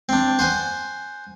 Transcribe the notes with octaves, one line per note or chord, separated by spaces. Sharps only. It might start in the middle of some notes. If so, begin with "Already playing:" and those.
C4 D4
C5 F#5 G#5